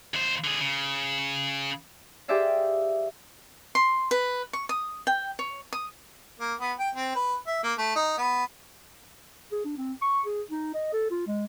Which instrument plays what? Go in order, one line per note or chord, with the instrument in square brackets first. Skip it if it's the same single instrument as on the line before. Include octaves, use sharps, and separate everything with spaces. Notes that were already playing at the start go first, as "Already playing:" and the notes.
[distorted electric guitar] D#2 C5
D3 G#4
C#3
[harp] G4 G#4 C5 D5 E5 F5
[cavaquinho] C6
B4
C#6
D#6
G5
C#5
D#6
[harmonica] A#3
B3
G5
C4
B4
E5
A#3
A3
D#4
B3
[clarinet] G#4
D4
C4
C#6
G#4
D#4
D#5
A4
F4
G#3